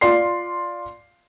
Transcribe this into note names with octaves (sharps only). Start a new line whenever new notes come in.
F4 D5 C6 C7